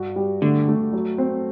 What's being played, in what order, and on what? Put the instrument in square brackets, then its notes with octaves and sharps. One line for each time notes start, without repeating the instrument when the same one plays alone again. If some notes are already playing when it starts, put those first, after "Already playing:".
Already playing: [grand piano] G2 F#4
G3
[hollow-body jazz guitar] D3 [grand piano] A3
[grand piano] A3
F#3
C4